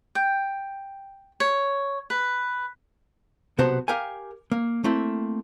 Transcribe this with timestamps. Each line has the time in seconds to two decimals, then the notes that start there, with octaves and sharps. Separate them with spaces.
0.15 G5
1.40 C#5
2.10 B4
3.58 B1 C3 B3 F#4 C5 A5
3.88 G4 A#4 F5 G5 G#5
4.52 A#3
4.84 A3 A#3 C4 E4